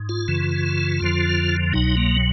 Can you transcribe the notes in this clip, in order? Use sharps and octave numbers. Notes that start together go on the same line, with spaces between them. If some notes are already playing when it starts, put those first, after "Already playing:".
Already playing: G#2
F4
F#2 C#3 E3
F2 D3 F3
C2 B2 F#3 D#4
A#3